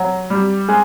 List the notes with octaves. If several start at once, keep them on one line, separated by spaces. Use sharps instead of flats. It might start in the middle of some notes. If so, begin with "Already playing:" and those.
Already playing: F#3
G3
G#3